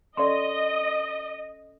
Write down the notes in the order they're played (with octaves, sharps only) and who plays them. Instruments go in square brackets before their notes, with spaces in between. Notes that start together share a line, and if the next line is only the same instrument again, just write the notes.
[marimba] C#4 A4 [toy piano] D5 C6 [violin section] D#5